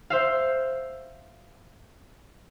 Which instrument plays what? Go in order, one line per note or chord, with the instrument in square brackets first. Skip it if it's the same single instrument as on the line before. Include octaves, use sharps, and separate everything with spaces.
[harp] C5 E5 F5